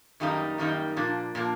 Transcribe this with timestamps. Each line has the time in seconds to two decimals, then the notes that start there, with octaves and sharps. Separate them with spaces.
0.20 F#2 D#3 G3 A#3 D#4
0.58 F#2 D#3 G3 A#3 D#4
0.96 A#2 F3 A#3 D4
1.35 A#2 F3 A#3 D4